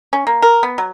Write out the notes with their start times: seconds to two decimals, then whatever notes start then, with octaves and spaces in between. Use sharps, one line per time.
0.13 C#4
0.27 A#3
0.42 A#4
0.63 B3
0.78 F#3